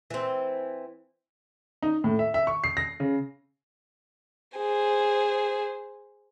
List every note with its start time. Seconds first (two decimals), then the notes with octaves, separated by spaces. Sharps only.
0.10 E3 C4
1.82 D#4
2.04 A2
2.19 E5
2.34 E5
2.47 C#6
2.64 C7
2.77 A#6
3.00 C#3
4.58 G#4 C5